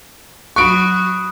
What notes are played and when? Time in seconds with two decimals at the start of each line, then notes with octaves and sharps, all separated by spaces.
0.56 F#3 F#4 B5 C#6 D#6 F#6 D7